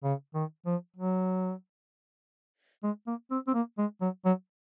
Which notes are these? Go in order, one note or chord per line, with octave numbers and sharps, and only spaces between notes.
C#3
D#3
F3
F#3
G#3
A#3
C4
C4
A#3
G#3
F#3
F#3